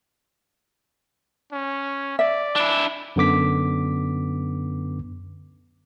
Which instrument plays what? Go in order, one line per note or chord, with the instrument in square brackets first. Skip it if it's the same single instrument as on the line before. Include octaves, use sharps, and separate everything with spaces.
[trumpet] C#4
[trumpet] D5 [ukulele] E5
[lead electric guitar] D4 E4
[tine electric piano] F#2 D3 B3 D6 B6